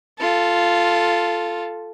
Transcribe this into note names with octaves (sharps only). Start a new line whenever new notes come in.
F4 A4